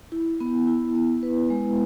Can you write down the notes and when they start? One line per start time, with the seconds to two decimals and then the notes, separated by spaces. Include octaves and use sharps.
0.12 E4
0.40 B3
0.67 E4
0.95 B3
1.23 B4
1.50 G#3